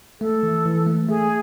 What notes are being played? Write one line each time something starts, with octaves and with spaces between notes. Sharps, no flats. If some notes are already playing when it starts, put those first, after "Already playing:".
A3 A4
E3
E3
A3
A3 G#4